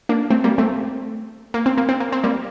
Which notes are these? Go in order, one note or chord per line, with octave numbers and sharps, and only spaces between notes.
A#3 D4
A3 C4
G3 A#3
A3 C4
A#3
C4
A#3
C4
A#3
C4
G3 A#3